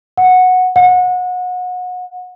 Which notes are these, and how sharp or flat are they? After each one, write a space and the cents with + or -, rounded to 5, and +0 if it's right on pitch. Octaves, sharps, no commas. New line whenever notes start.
F#5 -10
F#5 -30